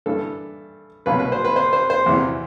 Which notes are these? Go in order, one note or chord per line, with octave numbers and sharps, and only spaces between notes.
G2 E3 A4
C2 B2 F#3 B4
B4
C5
B4
C5
C5
C5
E2 C3 E3